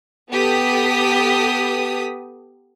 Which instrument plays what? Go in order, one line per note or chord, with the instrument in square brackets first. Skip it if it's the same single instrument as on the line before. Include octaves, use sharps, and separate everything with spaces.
[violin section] B3 G4 A4 D#6 B6